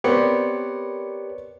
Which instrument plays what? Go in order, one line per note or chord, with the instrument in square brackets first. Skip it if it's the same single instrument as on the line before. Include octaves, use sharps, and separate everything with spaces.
[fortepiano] B3 C4 [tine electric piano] G4 C#5 C#7 [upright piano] A#4 B4 D5